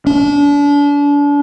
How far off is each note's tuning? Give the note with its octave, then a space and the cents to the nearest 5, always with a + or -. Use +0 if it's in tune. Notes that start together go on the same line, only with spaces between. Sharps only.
D4 -35